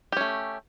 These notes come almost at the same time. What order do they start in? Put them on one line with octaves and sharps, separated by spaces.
G4 C#4 A3